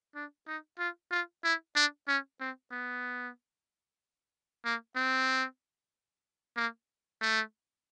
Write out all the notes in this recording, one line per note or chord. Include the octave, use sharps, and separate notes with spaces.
D4
D#4
F4
F4
E4
D4
C#4
C4
B3
A#3
C4
A#3
A3